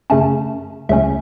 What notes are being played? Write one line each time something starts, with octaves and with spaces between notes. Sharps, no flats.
F#2 C#3 A3 C#4 A5
C#2 C#3 F#3 A3 C#4 E5